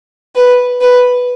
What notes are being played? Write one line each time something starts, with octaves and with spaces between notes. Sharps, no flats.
B4
B4